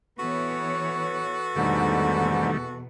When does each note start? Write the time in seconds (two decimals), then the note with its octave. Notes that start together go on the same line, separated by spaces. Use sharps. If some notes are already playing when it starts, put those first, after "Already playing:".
0.18 E3 B3 F#4 A4 B4 C#5
1.56 E2 G#2 B2 D3 D#3 G3 A3